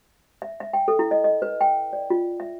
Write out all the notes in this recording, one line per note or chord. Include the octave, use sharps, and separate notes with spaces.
E5
E5
G5
A4
E4
D#5
D#5
B4
G5
D5
F4
E5